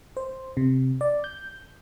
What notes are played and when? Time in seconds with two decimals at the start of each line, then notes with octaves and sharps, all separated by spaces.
0.17 C5
0.57 C3
1.01 D5
1.24 G6